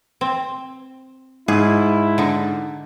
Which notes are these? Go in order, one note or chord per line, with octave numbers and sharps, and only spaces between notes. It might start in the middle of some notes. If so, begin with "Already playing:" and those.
C4
G#2 E4 G#4
D3 D#4